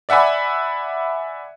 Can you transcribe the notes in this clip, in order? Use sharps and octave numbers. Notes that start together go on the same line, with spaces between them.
D5 E5 F#5 G#5 B5